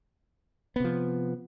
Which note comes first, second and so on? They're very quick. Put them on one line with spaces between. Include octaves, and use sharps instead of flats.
B3 C3 F3